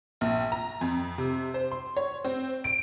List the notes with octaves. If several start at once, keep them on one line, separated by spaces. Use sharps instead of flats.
A#1
A#5
F2
C3
C5
C6
C#5
C4
D7